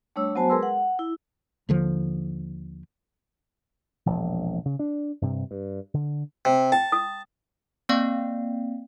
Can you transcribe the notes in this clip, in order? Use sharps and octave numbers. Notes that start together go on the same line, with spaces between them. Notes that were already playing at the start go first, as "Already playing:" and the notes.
G3 A3 D4 C#5 E6
F#3 B3 F#4 C5 G#5 A5
G#3 G#4 A#4 B4 C6 E6
F#5
E4
D#2 D3 F3
E1 A#1 F3
C#3
D4
G2 C3
G2
D3
C3
G5 A5
D#6
A#3 C4 D5 F5 G5